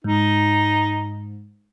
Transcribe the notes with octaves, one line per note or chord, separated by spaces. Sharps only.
G#2 D#4